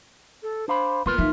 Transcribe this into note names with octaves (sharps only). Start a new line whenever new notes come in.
A4
D4 C5 F5 B5
A#3 B3 F4 A#4 B4
E3 D#4 E5